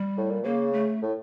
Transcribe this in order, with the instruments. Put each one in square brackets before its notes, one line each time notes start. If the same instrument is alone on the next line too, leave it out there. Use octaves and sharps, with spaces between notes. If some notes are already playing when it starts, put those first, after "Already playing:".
Already playing: [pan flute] G3
[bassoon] A2
A#2
[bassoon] C#3 [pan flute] A#3
[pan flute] A3
[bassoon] A2